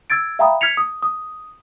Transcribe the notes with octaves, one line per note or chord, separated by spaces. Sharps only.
E6 G#6 A6 D7
E5 F5 G5 A#5 B5 D#6
F6 G#6 B6 C#7 F7
D#6
D#6